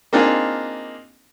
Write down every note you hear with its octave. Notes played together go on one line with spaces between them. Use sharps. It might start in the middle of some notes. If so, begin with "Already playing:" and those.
A#3 C4 D4 D#4 F4 G#4